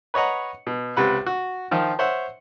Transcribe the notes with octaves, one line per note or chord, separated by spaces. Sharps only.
B4 C#5 D#5 F#5 A#5
B2
C#2 C3 B4 F#5
F#4
D#3 F3 F4
C5 C#5 E5 F#5